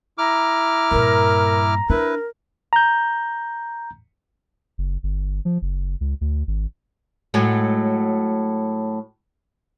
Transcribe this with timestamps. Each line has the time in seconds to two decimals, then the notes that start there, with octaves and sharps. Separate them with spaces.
0.18 E4 A#5 D6 F6
0.91 G2 A#2 A#4
1.90 D4 E4 A#4 B4
2.73 A#5 G6
4.78 F#1
5.03 G1
5.45 F3
5.62 F#1
6.01 C#2
6.21 D2
6.47 G#1
7.34 A2 F#3 G#3